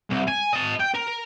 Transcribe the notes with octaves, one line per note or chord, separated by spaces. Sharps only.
C2
G#5
D#5 A5
G5
A#4